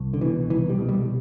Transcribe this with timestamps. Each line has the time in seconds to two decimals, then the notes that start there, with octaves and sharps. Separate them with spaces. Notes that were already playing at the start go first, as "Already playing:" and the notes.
Already playing: C2
0.14 D3
0.21 B2 E3
0.50 C2 E3
0.70 G3
0.78 B2
0.89 G3